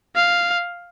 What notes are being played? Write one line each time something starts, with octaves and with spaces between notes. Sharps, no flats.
F5